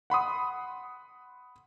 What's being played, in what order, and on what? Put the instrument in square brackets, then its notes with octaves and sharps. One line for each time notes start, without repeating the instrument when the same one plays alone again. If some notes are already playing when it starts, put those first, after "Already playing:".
[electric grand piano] F#5 B5 C6 D#6